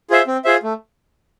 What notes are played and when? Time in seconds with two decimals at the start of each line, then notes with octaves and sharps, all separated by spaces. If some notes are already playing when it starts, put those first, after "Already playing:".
0.10 F4 G#4 C5 E5
0.27 C4
0.45 F4 G#4 C5 E5
0.63 A3